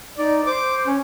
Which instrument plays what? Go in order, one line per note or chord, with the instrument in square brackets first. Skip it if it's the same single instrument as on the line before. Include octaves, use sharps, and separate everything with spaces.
[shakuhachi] D#4 [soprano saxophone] D5
[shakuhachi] C5 [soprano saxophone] D6
[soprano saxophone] C#4